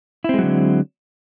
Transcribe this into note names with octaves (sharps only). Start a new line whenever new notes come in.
D3 F#3 G#3 C4 E4